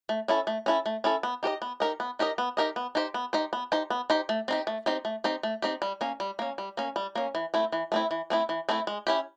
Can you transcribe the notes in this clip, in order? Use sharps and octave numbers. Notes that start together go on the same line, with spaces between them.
A3
C#4 E4 A4
A3
C#4 E4 A4
A3
C#4 E4 A4
B3
D#4 G4 A#4 D#5
B3
D#4 G4 A#4 D#5
B3
D#4 G4 A#4 D#5
B3
D#4 G4 A#4 D#5
B3
D#4 G4 C5
B3
D#4 G4 C5
B3
D#4 G4 C5
B3
D#4 G4 C5
A3
C4 D#4 G4
A3
C4 D#4 G4
A3
C4 D#4 G4
A3
C4 D#4 G4
G3
A#3 C#4
G3
A#3 C#4
G3
A#3 C#4
G3
A#3 C#4
E3
A3 C4 E4
E3
A3 C4 E4
E3
A3 C4 E4
E3
A3 C4 E4
G#3
C#4 E4 G4